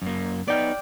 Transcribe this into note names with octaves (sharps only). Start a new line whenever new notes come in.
F#2 A#3
B3 D#4 D5 G5 F6